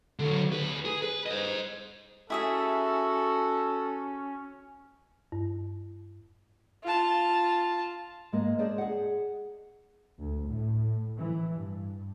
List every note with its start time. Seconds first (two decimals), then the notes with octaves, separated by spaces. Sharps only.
0.19 D3 F#3
0.52 D2 B4
0.85 G#4
1.02 B4
1.26 C5 D#5
2.30 C#4 E4 F#4 G#4 A4 E5
5.32 G2
6.83 F4 A5
8.32 G#2 G#3 A#3 D#5
8.58 G#4 C5 D5 D#5 A5
8.78 G#4 F#5
10.19 D2
10.49 A2
11.17 E3
11.55 G2